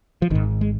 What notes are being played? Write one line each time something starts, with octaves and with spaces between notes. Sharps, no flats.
F3
G#1 G#2 D#3
G#3